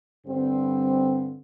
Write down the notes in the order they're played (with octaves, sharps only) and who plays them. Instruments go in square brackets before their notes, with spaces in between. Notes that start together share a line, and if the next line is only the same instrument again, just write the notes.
[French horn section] G2 D3 G3 C4